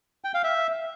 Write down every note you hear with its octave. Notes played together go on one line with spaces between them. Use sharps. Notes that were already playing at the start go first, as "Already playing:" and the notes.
G5
F5
E5